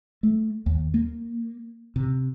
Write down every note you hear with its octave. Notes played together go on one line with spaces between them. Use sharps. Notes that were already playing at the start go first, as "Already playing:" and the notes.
A3
D#2
A#3
C3